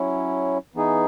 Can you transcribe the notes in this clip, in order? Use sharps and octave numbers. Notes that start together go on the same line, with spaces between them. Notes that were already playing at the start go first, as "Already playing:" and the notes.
Already playing: F#3 C#4 E4
E3 B3 D#4 G#4